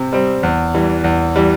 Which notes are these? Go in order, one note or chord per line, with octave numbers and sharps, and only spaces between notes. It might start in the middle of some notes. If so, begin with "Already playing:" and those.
Already playing: C3 C4
G3 C4
E2
E3 G3
E2
E3 G3